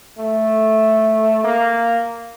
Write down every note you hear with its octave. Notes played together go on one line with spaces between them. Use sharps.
A3
A#3